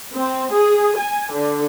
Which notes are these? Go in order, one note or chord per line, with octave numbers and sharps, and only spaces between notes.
C4
G#4
G#5
D3